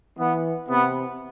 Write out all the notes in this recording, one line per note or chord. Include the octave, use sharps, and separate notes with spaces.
E3 B3
C3 B3